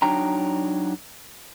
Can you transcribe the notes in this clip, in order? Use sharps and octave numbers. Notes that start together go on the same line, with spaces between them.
F#3 D4 D#4 G5 A#5